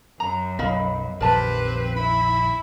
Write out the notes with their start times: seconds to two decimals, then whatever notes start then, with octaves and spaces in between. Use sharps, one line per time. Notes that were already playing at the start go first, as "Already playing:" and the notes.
0.20 F#2 A#5
0.59 B1 D#5 F5 B5
1.20 A#1 F2 D#3 C4 G4 A#4 B4 A5
1.96 E4 B5